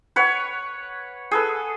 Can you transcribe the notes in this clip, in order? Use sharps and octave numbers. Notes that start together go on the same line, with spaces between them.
B4 C#5 F#5
G#4 A4 B4